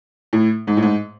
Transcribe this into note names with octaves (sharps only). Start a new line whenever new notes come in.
A2
G#2
A2
G#2